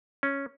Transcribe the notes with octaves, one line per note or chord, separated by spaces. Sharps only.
C#4